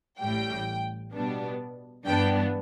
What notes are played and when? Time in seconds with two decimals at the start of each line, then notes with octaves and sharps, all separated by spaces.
0.21 A1 A2 G3 G5
1.13 B2 G3 B3 D4
2.06 G2 E3 B3 D4 G5